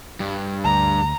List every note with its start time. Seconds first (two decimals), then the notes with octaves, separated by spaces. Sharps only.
0.20 G2 G3
0.65 D2 A#5